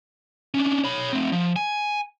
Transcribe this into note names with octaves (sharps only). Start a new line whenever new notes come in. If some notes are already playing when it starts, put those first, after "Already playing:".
C#4 D4
C#5 B5
A3 C4
F3
G#5